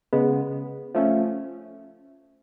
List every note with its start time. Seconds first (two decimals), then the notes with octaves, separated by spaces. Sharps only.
0.13 C#3 G#3 B3
0.95 F3 A3 C#4